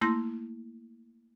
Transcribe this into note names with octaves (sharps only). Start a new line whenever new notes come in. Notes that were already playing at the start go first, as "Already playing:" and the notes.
A3 A#3 E4 C6 G6 A#6